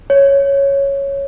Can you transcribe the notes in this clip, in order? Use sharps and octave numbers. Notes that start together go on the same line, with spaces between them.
C#5